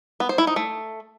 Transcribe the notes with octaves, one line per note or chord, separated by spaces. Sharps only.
B3
C5
E4
D#4
A3